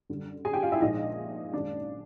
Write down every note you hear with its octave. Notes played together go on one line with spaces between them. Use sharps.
F#2 D3 G3
G#4 G#5
G4 G5
F4 F5
E4 E5
A#1 A#2 F3 G#3 D#4 D#5
F#2 D#3 G#3 D4 D5